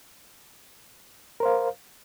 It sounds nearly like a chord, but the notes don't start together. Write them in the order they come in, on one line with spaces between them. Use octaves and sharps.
A#4 C5 F5